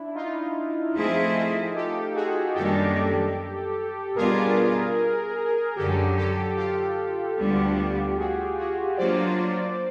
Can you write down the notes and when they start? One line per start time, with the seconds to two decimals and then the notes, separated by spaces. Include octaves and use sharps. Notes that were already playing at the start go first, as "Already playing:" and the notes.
Already playing: D4 E4
0.15 D#4 F4
0.95 F3 A3 C4 E4 G#4
1.75 G4 A4
2.15 F#4 G#4
2.55 F#2 D#3 G3 A#3 D4 G4 A4
4.16 B2 G3 B3 D4 F4 G#4 A#4
5.76 F#2 D3 F#3 G4 A4
6.17 G4 A4
6.57 F4 G4
7.38 D2 D3 G3 B3 D4
8.17 F#4 G#4
8.57 F#4 G#4
8.97 F#3 A#3 D4 F4 C5 D5